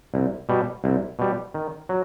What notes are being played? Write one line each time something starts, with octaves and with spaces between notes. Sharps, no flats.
C2
B2 G3
C2
B2 G3
D#3
F#3